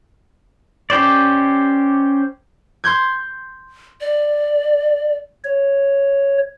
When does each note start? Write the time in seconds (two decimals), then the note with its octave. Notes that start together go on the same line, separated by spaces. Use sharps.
0.90 C#4 G4 C5 D5
2.84 C6 G6 G#6
4.01 D5
5.44 C#5